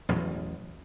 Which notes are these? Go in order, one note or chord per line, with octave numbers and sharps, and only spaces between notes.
A1 E2 B2 F#3